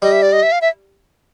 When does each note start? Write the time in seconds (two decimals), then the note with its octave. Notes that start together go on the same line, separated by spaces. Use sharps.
0.02 G3 D#5
0.12 E5
0.22 D5
0.32 D#5
0.43 E5
0.52 F5
0.61 E5